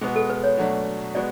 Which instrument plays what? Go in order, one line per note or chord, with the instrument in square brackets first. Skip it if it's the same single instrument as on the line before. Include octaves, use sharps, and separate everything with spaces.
[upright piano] B2 G#3 B3 [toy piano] G#4
[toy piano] A4
B4
C#5
[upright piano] B2 F#3 A3 D4
[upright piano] G#3 B3 F#4 [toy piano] D5